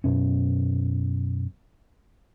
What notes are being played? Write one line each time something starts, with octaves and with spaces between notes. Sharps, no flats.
F#2 B2 C#4